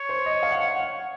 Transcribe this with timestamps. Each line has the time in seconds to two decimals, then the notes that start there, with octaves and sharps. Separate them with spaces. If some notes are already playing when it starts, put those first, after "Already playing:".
Already playing: C#5
0.09 C5
0.26 D#5
0.43 F5
0.51 F#5
0.60 F5
0.76 F#5